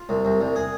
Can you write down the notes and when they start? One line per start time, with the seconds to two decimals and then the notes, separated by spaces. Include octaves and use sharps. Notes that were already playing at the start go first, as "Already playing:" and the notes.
Already playing: F4
0.09 C2
0.25 C2
0.40 C2
0.56 G#4